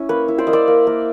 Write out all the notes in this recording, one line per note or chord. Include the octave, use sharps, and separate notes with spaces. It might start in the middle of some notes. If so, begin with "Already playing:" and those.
Already playing: C#4 E4
A#3 B4 C#5
E4
C5 D5
A#3 D#5
D5 E5
A#3
A#3